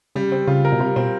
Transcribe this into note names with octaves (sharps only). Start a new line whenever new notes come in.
C#3 G3
C4
C#3 F4
A#4
B2
C3 G3
B2 C4